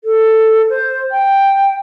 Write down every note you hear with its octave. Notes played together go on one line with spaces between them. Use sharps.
A4
C5
G5